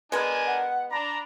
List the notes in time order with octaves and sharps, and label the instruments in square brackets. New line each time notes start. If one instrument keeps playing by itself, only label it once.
[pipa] G#3 B3 [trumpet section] D4 A#4 G#5
[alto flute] F#5
[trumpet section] D4 A#5 [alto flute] B5